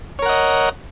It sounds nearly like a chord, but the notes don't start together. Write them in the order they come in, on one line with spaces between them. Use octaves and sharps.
C#5 A#4 F#5 D#5